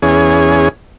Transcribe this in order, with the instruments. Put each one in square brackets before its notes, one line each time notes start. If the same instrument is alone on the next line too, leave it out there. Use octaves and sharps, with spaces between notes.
[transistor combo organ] E2 C#4 G#4